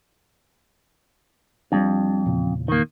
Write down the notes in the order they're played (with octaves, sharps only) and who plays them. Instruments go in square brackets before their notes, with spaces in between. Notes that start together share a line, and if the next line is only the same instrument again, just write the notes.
[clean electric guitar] F2 [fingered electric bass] F3 G3 D4
[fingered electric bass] E2 A#2 C#3
[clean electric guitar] D#3 A#3